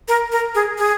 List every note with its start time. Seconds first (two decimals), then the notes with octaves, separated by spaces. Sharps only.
0.08 A#4
0.32 A#4
0.55 G#4
0.78 G#4